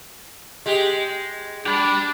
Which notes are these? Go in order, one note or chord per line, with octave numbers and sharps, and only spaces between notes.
G#3 G4
D4 G4 B5